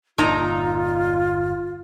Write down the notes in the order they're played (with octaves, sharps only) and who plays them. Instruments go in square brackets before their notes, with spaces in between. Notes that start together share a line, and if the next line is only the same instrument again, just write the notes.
[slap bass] G1 E2 [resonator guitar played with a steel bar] A#2 D#4 A#5 [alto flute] F4